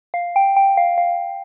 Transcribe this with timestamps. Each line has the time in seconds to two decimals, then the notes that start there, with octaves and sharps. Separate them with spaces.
0.14 F5
0.36 G5
0.57 G5
0.77 F5
0.98 F5